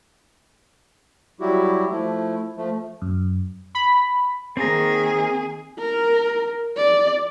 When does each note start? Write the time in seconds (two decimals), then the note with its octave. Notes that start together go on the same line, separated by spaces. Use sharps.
1.40 F#3 G3 E4 F#4 G4
1.90 F3 A3 E4
2.56 F3 A3
3.02 F#2
3.75 B5
4.57 D#3 A#3 C4 G#4 A#5
5.79 A#4
6.77 D5